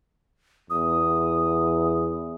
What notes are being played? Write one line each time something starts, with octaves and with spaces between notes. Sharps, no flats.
E2 D#6